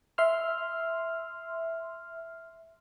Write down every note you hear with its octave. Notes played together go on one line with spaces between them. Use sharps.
E5 C6 F6